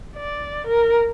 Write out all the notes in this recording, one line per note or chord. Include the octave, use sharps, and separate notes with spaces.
D5
A#4